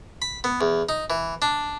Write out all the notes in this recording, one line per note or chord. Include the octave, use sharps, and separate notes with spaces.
B5
B3
E2
D#4
E3
D4